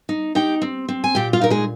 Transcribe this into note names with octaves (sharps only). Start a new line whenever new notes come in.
D#4
D#4 G4 G5
C4
C4
G#5
A#2 G4 G5
F4 F5
D#4 A#4
G#3 G#4